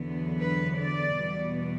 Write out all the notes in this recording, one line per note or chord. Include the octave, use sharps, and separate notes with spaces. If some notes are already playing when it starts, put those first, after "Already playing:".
Already playing: E2 D3 F#3 B3
B4
D5
E2 B2 G3 B3